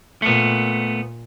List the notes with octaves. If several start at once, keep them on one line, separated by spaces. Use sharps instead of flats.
A#2 A3 B3